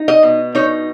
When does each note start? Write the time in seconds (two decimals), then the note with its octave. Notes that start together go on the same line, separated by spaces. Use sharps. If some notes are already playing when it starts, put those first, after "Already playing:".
Already playing: D#4
0.08 D#5
0.23 B2
0.55 D#4 C#5